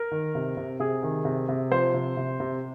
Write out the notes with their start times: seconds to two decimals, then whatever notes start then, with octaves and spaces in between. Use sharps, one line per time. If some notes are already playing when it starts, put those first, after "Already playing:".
Already playing: A#4
0.11 D#3
0.35 C3
0.57 C3
0.80 C3 G#4
1.03 D#3
1.25 C3
1.49 C3
1.71 F3 C5
1.94 C3
2.17 C3
2.40 C3